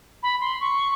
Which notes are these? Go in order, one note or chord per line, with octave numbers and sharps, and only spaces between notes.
B5
C6
C#6